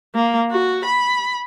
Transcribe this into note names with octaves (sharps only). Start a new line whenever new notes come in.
A#3
F#4
B5